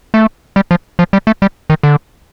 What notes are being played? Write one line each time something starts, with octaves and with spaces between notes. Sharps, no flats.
A3
G3
F3
F3
G3
A3
G3
D#3
D3